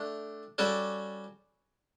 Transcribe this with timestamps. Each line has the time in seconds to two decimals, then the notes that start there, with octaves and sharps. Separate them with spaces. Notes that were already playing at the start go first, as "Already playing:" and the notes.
Already playing: A3 D4 G4
0.58 G3 C#4 F#4 A4 D5